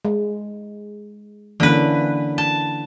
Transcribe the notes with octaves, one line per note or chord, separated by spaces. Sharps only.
G#3
D3 E3 A#3 C#4 B4
A5